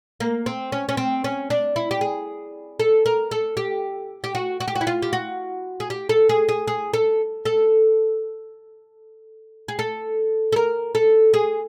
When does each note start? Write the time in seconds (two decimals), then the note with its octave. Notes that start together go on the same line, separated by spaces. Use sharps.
0.20 A#3
0.46 C4
0.72 C#4
0.89 C#4
0.97 C4
1.24 C#4
1.50 D4
1.76 E4
1.91 G4
2.01 G#4
2.80 A4
3.06 A#4
3.31 A4
3.57 G4
4.24 G4
4.35 F#4
4.60 F#4
4.68 G4
4.76 F#4
4.81 E4
4.87 F4
5.02 G4
5.13 F#4
5.80 G#4
5.90 G4
6.09 A4
6.29 G#4
6.49 G#4
6.67 G#4
6.94 A4
7.45 A4
9.68 G#4
9.79 A4
10.52 A4
10.56 A#4
10.95 A4
11.34 G#4